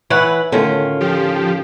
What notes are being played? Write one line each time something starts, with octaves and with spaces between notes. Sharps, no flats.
E3 E4 B4 C#5 F#5
A2 D3 D#3 C#4 F4
F3 G4